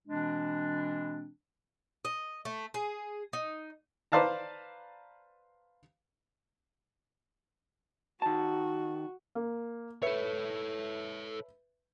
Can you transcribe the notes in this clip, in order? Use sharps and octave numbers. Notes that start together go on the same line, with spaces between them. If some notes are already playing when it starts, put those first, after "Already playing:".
B2 E3 G#3 C4 D4
D#5
A3
G#4
D#4
B4 C5 D5 F5 A5 A#5
D#3 F#4 A5
A#3
A4 B4 C#5 E5 C#7